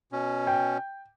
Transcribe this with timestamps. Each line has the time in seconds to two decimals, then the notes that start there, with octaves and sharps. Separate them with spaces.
0.12 B2 C#4
0.47 G5